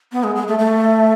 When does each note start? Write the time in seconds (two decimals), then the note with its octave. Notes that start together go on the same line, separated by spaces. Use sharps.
0.12 B3
0.24 G#3
0.35 G#3
0.48 A3
0.59 A3